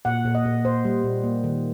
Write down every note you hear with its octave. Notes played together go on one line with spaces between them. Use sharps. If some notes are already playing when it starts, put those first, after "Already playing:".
A#2 F#5
A#2
D#5
A#2
A#2 C5
G3
A#2
A#3
D#3